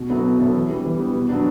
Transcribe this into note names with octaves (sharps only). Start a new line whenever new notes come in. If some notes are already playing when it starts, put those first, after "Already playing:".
Already playing: B2
F#3 B3 E4 A4
B2
F#3 B3 E4 A4
E3
G3 B3
E3
G3 B3
B2
F#3 B3 D4